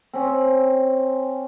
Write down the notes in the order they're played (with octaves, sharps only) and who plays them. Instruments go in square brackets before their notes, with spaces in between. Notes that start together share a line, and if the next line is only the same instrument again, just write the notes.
[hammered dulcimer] C4 C#4